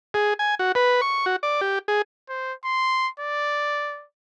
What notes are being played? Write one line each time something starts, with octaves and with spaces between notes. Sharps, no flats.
G#4
G#5
F#4
B4
C#6
F#4
D5
G4
G#4
C5
C6
D5